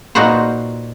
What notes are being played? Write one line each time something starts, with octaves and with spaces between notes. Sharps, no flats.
A#2 A#3 D#4 F#4 B4 C5